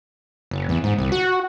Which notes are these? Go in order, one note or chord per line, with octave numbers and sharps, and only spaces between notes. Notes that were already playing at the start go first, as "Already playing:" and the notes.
F#1
E2
G#2
C2
F#4